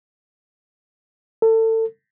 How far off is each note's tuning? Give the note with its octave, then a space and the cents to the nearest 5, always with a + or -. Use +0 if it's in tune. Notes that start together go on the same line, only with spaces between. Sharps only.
A4 +30